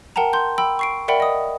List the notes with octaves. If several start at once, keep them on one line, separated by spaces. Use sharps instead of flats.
A#4 F#5 G5 A5 A#5
C6 G6
G5 B5 E6
C#6 C7 D7
A#4 D5 E5 F#5 G5 B5
D#5 D#6